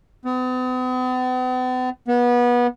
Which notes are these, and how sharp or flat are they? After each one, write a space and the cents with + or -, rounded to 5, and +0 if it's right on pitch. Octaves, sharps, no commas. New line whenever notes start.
B3 +45
B3 -25